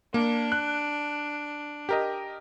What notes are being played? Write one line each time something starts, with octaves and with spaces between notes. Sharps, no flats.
A#3 D4
F#6
G4 A#4 D#5